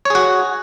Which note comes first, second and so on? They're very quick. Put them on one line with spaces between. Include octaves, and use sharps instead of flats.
C#5 G#4 F#4